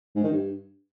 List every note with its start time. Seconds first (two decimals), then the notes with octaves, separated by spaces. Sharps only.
0.16 G#2
0.24 D#3
0.31 G2